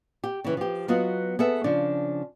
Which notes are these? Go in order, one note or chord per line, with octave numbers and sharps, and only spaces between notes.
G4
C#3 E3
F3 G4
F#3 B3 F4 F#4 D#5
B3 G#4 A4 E5
C#3 F3 D4